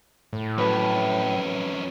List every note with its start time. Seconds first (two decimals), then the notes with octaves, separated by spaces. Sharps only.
0.33 A2
0.58 F2 F#3 C#4 B4